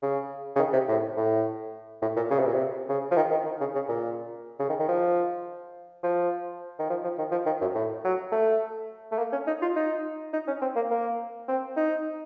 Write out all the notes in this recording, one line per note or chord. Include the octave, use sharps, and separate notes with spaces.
C#3
C#3
D#3
C3
A2
A2
A2
A#2
C#3
C3
A#2
C3
C#3
F3
D#3
D#3
D#3
C#3
C#3
A#2
C#3
D#3
D#3
F3
F3
D#3
F3
F3
D#3
F3
D#3
F#2
A2
F#3
A3
A3
A#3
C#4
D#4
F4
D#4
D#4
C#4
C4
A#3
A#3
C4
D#4